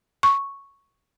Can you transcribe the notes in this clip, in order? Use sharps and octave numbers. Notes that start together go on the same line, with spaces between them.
C#6